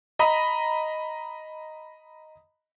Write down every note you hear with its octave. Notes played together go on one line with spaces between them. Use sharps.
D#5 A#5 B5 D#6